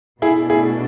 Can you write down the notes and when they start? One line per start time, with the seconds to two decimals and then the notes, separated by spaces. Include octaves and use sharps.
0.22 B2 A3 D4 E4 G#4
0.50 E4 G#4